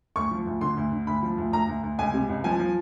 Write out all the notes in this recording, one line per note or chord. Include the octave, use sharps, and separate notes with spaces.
D2 C#6
F3
D2
D3 C6
D2
D3
D2 B5
F3
D2
D2 A#5
D2
D2
C#2 G#5
C3
C#2
F3 G#5
F3